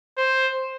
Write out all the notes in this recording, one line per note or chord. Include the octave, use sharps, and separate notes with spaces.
C5